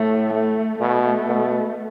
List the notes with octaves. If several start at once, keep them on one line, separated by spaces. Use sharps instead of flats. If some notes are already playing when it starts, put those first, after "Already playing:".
Already playing: A2 A3
A3
B2 A3
B2